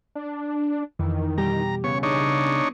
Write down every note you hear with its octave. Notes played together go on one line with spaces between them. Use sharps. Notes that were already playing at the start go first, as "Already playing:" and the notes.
D4
F2 D#3 E3
B2 G3 G4 A#5
C#3 B3 C#5
D4 D#4 C#5